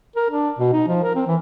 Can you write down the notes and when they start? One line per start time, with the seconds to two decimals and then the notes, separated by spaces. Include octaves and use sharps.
0.16 A#4
0.30 D4
0.59 B2
0.73 D#4
0.88 F3
1.03 A#4
1.15 C4
1.27 E3